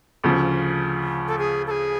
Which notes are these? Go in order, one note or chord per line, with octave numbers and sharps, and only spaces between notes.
D2 C#3 F3
A4
G#4
A4
G#4